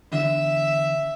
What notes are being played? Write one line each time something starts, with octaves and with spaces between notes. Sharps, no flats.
E2 D3 E5